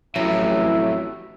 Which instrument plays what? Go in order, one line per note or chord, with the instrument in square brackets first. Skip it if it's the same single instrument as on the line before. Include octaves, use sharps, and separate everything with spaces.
[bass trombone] A1 [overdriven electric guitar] F2 A2 [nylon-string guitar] F#3 [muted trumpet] E5